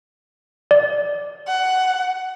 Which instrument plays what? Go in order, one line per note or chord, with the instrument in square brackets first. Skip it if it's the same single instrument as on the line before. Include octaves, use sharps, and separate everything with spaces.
[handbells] D5
[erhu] F#5